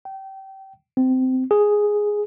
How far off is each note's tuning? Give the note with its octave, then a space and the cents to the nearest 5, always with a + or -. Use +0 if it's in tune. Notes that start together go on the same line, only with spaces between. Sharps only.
G5 -25
C4 -20
G#4 +0